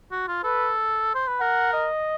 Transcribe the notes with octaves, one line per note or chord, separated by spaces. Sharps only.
F#4
F4
A4 B4
C5
B4
A#4 F#5
D#5